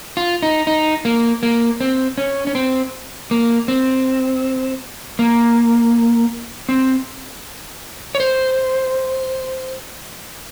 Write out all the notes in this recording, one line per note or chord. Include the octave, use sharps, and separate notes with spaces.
F4
D#4
D#4
A#3
A#3
C4
C#4
C#4
C4
A#3
C4
A#3
C4
C#5
C5